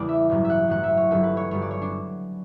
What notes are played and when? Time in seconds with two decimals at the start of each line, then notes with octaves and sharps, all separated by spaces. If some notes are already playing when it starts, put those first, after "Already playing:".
Already playing: E2 C#3 G3 D5
0.09 E5
0.30 A1 G2 F#3
0.45 E5 F#5
0.68 A1 G2 F#3 F#5
0.83 E5
0.97 C#5
1.11 G1 G2 F#3 A4
1.23 B4
1.37 C#5
1.51 G1 G2 F#3 C#5
1.62 D5
1.71 C#5
1.82 D4